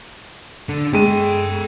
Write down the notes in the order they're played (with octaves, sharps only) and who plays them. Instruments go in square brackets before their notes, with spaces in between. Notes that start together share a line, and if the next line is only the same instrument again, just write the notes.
[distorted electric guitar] D4 A4
[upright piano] G#3 D#7 [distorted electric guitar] A4 G5